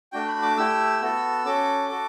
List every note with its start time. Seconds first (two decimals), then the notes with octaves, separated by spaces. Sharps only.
0.12 A3 D4 F#4 G5
0.28 B5
0.42 D6
0.57 A3 E4 G4 E6
1.02 B3 F#4 A4
1.45 C#4 F#4 A4 D6
1.90 F#4 A4